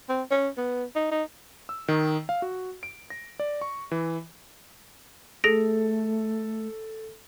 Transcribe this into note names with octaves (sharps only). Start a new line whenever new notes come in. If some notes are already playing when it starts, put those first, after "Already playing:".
C4
C#4
B3
D#4
D#4
E6
D#3
F5
F#4
D7
A#6
D5
C#6
E3
A3 G#4 A4 A#6 D7